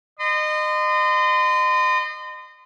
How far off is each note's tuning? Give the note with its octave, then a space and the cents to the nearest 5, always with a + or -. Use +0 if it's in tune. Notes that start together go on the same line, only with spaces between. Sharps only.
D#5 -30 C6 -40